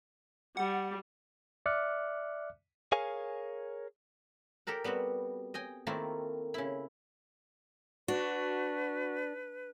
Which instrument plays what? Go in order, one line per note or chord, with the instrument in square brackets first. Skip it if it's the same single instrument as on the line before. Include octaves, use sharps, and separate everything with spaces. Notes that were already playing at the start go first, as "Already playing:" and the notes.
[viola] G3 [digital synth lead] F#5
[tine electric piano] D5 E5 D6 F6 F#6 C#7
[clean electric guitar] G#4 A#4 C#5 F5 G#5
[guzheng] G4 A4 A#4 F#5
G3 B3 C4 F#4
D#5 G5 G#5
D#3 A3 A#3 C4 E4 F4
C#3 E4
[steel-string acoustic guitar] D4 [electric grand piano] F#4 [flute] B4